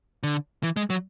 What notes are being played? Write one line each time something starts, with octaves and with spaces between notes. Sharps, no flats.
D3
E3
G#3
F#3